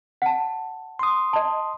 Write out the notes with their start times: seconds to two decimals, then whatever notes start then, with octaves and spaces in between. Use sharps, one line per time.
0.22 F#5 A5
0.99 C6 D#6
1.33 D#5 A5